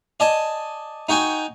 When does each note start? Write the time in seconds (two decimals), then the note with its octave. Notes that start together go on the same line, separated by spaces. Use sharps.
0.20 D5 D#5 G#5 A5
1.09 D#4 F#4 G5 G#5